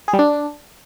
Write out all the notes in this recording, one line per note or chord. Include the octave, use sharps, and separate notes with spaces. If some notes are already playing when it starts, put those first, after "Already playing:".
G#4
G3
D4